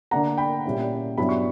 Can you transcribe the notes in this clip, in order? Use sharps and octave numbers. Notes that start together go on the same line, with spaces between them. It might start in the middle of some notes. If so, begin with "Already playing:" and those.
D3 A#3 D4 F#5 A#5
G5 B5
A#2 G3 C#4 E4
G2 F#3 B3 E4 B5
C#6